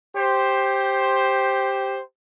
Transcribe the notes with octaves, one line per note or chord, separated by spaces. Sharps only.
G4 C5